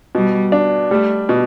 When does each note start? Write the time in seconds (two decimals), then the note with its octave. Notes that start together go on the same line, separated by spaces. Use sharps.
0.15 B2 G3
0.52 D4
0.91 G3 A3
1.29 B2